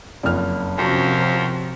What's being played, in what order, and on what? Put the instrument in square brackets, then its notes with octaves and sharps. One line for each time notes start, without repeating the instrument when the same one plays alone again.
[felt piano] F#1 F2 F6
[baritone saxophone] F2 [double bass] C3 F3 [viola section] C#4 F#4 A#4 [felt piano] A5